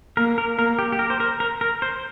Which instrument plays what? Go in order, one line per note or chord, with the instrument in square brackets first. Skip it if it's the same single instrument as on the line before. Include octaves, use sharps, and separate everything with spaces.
[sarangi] A#3 [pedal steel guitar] A#4
[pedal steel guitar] A#4
[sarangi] A#3 [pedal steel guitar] A#4
[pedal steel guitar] G4
G4
A#4
C5
A#4
A#4
A#4
C5